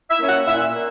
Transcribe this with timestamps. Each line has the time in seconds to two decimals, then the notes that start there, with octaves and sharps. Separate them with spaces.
0.11 E5
0.19 A#3 C#4
0.29 F#5
0.47 A#2 E5
0.75 A#3